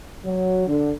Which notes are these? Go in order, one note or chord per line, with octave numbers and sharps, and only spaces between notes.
F#3
D3